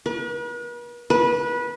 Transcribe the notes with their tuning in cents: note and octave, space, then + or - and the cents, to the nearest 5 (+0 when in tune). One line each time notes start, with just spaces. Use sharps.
B4 -45
B4 -25